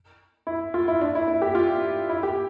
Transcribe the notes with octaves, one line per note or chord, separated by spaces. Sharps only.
E4
F4
E4
D4
E4
E4
G4
F4
E4
G4